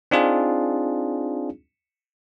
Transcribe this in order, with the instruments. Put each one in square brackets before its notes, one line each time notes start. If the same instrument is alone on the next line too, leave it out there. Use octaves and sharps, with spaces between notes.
[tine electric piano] C4 D4 D#4 F4 G#4